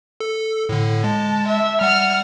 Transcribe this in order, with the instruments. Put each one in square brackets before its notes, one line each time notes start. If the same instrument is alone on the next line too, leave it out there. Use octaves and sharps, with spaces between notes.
[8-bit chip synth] A4
A2 D3
[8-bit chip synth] G#3 [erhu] A5
[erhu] E5
[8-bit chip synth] G3 F#5 [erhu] F6